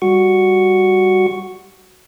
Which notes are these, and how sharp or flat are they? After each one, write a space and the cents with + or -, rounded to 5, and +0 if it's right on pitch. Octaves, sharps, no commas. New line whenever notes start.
G3 +0 F#4 +0 C#6 +0